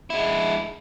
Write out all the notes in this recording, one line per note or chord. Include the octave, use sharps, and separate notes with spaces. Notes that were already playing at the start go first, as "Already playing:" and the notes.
G#3 E4